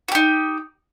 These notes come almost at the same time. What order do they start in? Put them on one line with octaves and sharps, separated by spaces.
F#4 G4 D#4